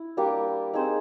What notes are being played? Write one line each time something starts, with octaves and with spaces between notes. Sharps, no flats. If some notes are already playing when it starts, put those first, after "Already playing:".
Already playing: E4
G3 A#3 D4 G4
C4 D#4 G#4 C5